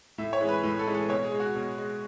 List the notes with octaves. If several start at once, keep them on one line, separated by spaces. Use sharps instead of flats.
A2 E5
C#5
E3 G#3
B4
A2
A4
E3 G#3
A4
B2 C#5
G#4
G#3
F#4
B2
G#3